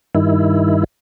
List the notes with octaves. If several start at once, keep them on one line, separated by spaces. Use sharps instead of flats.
G2 D#3 E4